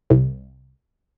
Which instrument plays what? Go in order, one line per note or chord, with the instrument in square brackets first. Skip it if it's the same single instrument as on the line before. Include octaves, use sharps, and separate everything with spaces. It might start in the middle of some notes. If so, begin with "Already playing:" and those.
[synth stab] C2